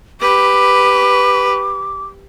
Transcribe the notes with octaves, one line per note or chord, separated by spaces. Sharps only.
G4 B4 D6